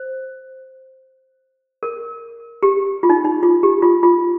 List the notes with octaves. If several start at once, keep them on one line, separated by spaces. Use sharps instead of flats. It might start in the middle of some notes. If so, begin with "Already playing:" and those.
Already playing: C5
A#4
G4
F4
D#4
D#4
F4
G4
F4
F4